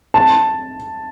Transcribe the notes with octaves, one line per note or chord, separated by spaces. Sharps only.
A5